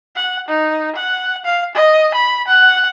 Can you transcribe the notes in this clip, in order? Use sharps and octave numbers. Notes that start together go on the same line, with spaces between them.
F#5
D#4
F#5
F5
D#5
B5
F#5